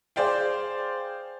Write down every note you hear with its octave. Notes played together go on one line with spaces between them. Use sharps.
G#4 C5 D5 F5 G5